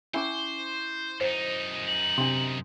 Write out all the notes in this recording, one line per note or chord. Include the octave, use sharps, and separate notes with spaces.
C#4 E4 C5 G#5 C#6 D6
F#2 D#4 C5
F#7
C3 D4 C6